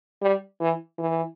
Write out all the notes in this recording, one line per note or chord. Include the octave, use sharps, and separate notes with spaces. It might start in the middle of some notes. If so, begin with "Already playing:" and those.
G3
E3
E3